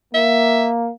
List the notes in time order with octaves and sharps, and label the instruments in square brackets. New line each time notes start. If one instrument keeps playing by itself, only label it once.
[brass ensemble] A#3 [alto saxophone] E5